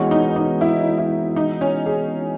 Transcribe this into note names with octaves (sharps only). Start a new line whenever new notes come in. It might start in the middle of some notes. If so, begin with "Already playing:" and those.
Already playing: E3 G#3 B3 C#4 F#4
D#4
D#4
E4
E4
D#4
C#4
G#4